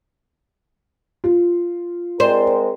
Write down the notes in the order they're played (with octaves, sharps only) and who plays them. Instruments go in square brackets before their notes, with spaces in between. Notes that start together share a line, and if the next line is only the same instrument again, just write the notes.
[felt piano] F4
[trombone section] G#3 C4 A#4 [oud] C5 [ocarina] D5